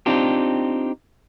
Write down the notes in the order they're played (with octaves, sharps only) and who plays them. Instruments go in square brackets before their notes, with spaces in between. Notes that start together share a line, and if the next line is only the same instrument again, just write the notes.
[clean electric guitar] C4 D4 D#4 F4 G4